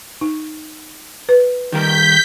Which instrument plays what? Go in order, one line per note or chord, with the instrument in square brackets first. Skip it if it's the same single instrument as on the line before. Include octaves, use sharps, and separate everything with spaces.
[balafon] D#4
B4
[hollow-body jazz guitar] D#3 G3 A#4 [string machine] G6 B6